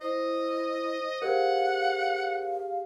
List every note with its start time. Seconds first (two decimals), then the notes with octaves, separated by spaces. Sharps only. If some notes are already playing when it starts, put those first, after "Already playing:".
0.01 E4 C5 D#5
1.22 G4 G#4 A#4 C5 F5 F#5